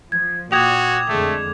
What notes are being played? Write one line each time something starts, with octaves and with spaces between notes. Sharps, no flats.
F3 G#6
A#2 F#4 G5 D6 D#6 G#6 F7
F2 D3 G#3 A3